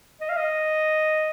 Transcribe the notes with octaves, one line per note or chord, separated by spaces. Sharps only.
D#5
F5
D#5